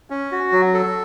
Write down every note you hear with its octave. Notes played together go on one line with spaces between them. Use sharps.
C#4
F#4
F#3
A4